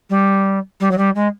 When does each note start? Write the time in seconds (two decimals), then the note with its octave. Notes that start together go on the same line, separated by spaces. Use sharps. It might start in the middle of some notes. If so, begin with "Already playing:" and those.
0.10 G3
0.80 G3
0.91 F#3
0.98 G3
1.15 G#3